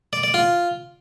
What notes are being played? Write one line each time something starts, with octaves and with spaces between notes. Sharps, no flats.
D5
D5
F4